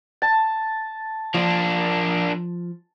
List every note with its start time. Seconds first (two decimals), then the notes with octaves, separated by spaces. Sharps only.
0.22 A5
1.35 F3 A#3 D4